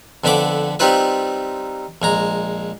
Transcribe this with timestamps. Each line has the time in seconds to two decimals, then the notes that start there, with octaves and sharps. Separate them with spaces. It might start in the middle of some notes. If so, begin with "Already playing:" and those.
0.24 F2 D3 B3 E5 B5 D6
0.79 G3 C4 D#4 F4 B4 E5
2.02 A#1 G#3 A#5